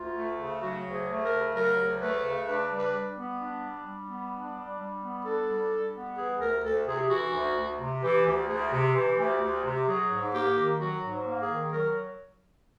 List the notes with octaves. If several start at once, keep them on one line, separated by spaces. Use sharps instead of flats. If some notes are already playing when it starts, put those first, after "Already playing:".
Already playing: D2 F4
A3
C#3
F#3 F#4
D2
G#4
A3
A#4
C#3
F#3 A#4
D2
A3 B4
C#3
D4 B4
G3
B4
G3
B3
D4
G3
G3
B3
D4
G3
G3
B3
D4 A4
G3
G3
B3
E3 G#4
D2 A#4
D2 A4
C3 G#4
E3 F#4
D2
D2
C3
E3 G4
D2
D2 G#4
C3
E3 G4
D2
D2
C3
F#3 G#4
G#2
A#3 G4
D#3
F#3 F#4
G#2
A#3
G#4
D#3
F#3 A#4